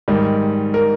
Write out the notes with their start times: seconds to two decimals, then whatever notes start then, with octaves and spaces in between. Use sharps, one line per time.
0.08 G#2 D#3 G3
0.74 A#4